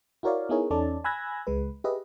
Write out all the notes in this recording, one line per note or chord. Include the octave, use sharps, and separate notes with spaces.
E4 F#4 A#4 C#5 D5 F5
B3 D#4 E4 G#4 A#4 C#5
E2 C#4 D#4 A4 D5 A5
G#5 B5 E6 F#6 G#6 A#6
C#2 G#3 B4
G4 G#4 B4 D#5 E5